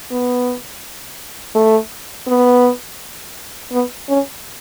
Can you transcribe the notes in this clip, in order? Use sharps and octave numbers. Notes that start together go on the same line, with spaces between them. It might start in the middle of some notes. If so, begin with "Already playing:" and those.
B3
A3
B3
B3
C#4